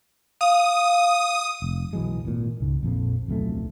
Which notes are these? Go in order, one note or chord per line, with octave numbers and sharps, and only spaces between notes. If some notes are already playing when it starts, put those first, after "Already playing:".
F5 D#6
F1
B1 E3 F#3 G#3
G#1 A#2
C#2 G#2
A#1 F2 F3
D1 B1 F2 A3